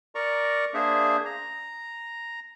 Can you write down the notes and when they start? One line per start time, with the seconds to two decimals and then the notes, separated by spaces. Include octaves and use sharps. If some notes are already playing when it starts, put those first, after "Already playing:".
0.15 A#4 D5 A#5 C#6
0.74 A#3 D4 G#4 C5 E5
1.25 A#5